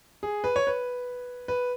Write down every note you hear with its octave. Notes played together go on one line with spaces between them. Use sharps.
G#4
B4
C#5
B4
B4